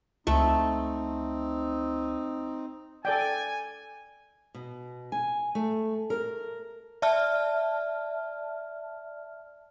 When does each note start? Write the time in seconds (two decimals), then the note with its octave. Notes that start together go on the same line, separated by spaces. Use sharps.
0.27 C#2 A3 C4 D#4
3.05 A4 D5 G5 G#5
4.55 B2
5.12 G#5
5.55 A3
6.10 A#4
7.02 D5 E5 A5 F6